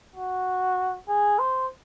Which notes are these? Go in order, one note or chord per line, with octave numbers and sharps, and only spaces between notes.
F#4
G#4
C5